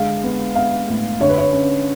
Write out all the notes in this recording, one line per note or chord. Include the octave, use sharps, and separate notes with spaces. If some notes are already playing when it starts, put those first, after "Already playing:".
Already playing: D3 G#3 F5
B3
B3 F5
A2
D3 C#5
B4
C#5
C#4